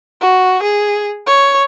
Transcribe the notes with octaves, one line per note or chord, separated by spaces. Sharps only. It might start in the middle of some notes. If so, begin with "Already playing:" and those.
F#4
G#4
C#5